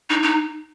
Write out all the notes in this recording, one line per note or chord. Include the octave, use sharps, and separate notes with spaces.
D#4
D#4